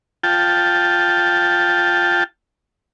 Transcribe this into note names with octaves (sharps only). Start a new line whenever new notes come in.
F4 G5 A5